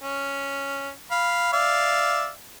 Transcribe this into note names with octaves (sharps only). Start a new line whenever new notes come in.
C#4
F5 B5
D5 E5 F5